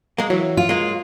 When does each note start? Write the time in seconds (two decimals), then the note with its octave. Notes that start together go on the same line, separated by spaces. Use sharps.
0.18 G#3 A#3
0.30 E3 F#3
0.57 F4
0.69 G#3 A#3